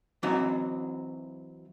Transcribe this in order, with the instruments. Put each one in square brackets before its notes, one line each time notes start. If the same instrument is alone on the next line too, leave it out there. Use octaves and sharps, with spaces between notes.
[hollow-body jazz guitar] E3 F#3 C4 D#4 F#4